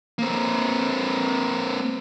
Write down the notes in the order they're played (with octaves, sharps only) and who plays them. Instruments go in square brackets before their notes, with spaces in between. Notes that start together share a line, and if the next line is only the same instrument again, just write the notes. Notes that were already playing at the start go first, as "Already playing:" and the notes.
[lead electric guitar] A#3 C4